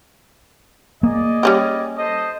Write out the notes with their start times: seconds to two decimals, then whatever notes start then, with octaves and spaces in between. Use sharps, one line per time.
1.03 A#3 G#4 D5 D#5
1.43 G3 C#4 G4
1.97 A4 C5 D#5